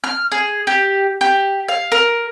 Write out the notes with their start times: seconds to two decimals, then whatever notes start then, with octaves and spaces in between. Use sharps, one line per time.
0.04 F6
0.32 G#4
0.67 G4
1.21 G4
1.69 F5
1.92 A#4